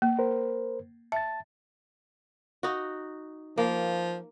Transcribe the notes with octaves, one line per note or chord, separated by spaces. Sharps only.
A#3
A#4 C5
E5 A5 A6
D#4 F#4
F3 A#3